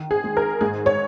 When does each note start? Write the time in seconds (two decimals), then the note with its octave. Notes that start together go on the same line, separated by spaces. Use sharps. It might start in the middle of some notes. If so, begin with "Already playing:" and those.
Already playing: D#3
0.11 G#4
0.24 G#3
0.37 A#4
0.61 G#2 G#4
0.86 C#5